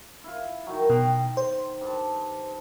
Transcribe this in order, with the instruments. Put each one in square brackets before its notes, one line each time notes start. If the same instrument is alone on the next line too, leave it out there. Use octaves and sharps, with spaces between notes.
[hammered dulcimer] E4 F4
D#3 F#3
[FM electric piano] B2 [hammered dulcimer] G5 A#5 C6
[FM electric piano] C5
[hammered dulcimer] G2 A5